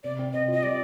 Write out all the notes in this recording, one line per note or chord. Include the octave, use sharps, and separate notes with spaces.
C3 D5
C4
C3 D#5
F4
D#5
G3 D5